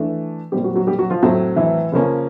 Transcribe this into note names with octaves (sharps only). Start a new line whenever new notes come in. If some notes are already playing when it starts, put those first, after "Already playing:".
Already playing: E3 A3 D4
A#2 G3 C4 G4
F#3 F#4
F#3 F#4
G3 G4
F#3 F#4
F3 F4
A2 F#3 A3 C4
E3 E4
C#3 F3 A#3 C#4